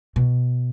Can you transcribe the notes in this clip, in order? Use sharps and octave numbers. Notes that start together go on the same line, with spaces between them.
B2